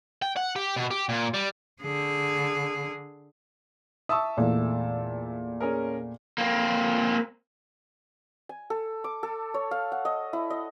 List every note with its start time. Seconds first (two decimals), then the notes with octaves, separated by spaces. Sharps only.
0.22 G5
0.36 F#5
0.56 G4
0.76 B2
0.91 G4
1.09 A#2
1.34 G3
1.82 D3 G#4
4.09 E5 A5 C#6 D#6 E6
4.37 E2 A#2 A3
5.61 C#4 G#4 A#4
6.38 A#3 C4
8.49 G#5
8.70 A4
9.04 D6
9.23 A4
9.54 C#5
9.71 F5
9.92 F#5
10.05 D#5
10.33 E4
10.50 D#5